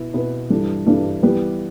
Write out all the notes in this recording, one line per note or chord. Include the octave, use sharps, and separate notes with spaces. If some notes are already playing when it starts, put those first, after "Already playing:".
Already playing: B2 B3 E4 B4
B2 B3 E4 B4
G2 E3 G3 D4 A4
G2 E3 G3 D4 A4
E3 G3 B3 G4 B4